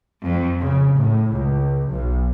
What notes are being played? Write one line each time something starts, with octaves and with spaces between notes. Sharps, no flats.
F2
C#3
A2
C#2
B1